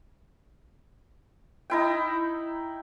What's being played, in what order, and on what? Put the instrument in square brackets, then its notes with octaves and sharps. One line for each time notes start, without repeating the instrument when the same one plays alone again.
[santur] D#4 E4 G5